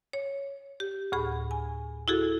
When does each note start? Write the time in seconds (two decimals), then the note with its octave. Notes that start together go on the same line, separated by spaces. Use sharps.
0.13 C#5
0.80 G4
1.12 D2 A2 G#4 B5
1.51 G#5
2.08 E4 F#4 G#4 A4